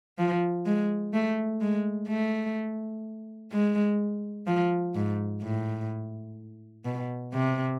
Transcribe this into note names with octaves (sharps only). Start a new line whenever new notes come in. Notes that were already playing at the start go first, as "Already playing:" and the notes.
F3
G#3
A3
G#3
A3
G#3
F3
G#2
A2
B2
C3